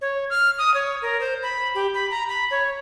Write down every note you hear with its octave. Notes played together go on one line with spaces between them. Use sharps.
C#5
F6
D#6
C#5
A#4
C5
B5
G4
B5
A#5
B5
C#5